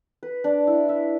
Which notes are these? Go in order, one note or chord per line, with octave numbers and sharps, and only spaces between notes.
B4
D4
E4
E5